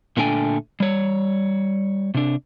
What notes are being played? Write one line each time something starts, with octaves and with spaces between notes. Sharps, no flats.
A#2 D3 A3 D4 G5 G#5
G3 C#5
C3 D4